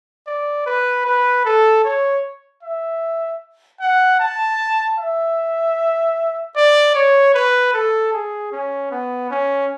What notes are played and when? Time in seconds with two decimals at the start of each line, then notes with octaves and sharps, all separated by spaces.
0.27 D5
0.66 B4
1.05 B4
1.45 A4
1.84 C#5
2.63 E5
3.80 F#5
4.20 A5
4.99 E5
6.56 D5
6.95 C#5
7.34 B4
7.74 A4
8.13 G#4
8.52 C#4
8.91 B3
9.31 C#4